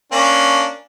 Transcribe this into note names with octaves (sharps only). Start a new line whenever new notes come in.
A#3 C#4 D4